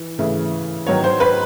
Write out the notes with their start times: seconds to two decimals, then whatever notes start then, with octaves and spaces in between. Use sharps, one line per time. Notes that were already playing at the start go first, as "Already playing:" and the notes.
Already playing: E3
0.19 C#3 E3 A3
0.87 D#3 F#3 B3 C#5
1.04 C5
1.20 B4